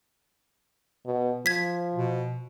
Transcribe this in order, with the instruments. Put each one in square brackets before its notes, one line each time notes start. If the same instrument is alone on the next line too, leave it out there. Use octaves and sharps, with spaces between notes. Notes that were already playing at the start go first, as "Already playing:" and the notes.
[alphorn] B2
[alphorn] F3 [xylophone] G#6 B6
[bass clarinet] B2